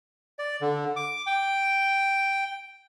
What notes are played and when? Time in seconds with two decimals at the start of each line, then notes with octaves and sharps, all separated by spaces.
0.39 D5
0.61 D3
0.96 D6
1.27 G5